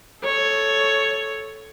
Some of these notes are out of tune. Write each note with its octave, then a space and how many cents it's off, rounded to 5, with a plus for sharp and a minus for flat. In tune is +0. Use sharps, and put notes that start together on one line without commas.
A4 -5 C#5 +0